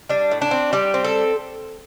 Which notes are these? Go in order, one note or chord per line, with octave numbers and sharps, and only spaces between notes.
G3 D4
A2
D4
C4
G3 G4
C4
A4